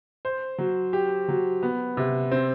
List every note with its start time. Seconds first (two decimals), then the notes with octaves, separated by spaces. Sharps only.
0.25 C5
0.58 F#3
0.93 G4
1.29 F#3
1.63 B3
1.97 C3
2.31 C4